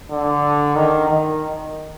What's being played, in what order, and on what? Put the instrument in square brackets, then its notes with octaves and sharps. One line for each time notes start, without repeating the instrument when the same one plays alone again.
[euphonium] D3
D#3
D#3